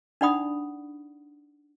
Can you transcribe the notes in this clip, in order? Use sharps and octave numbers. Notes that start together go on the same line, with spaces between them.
D4 D#4 D5 F#5 B5 D#6